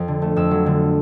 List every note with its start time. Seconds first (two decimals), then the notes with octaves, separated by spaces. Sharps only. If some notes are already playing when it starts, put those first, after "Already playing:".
Already playing: F2 F3
0.08 D3
0.22 A3
0.36 F2 E6
0.51 F#3
0.66 D3